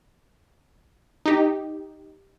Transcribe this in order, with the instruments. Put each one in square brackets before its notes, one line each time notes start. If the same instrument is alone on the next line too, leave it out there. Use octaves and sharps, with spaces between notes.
[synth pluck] D#4 G4